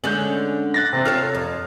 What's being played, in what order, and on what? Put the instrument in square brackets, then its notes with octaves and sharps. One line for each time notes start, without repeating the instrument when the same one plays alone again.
[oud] D3 G#3 C#4 [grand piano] G6 F#7
[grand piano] F#6 A6 A#6
C3 C4
[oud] F4 A4 C#5 [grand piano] F6
[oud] F2